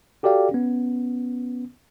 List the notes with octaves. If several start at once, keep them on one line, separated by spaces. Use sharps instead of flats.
F#4 G4 A4 D5 F5 G5
B3 C#4